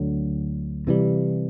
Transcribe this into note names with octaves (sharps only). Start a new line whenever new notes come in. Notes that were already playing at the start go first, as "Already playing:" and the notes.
Already playing: D2 D3 F#3
C3 E3 G3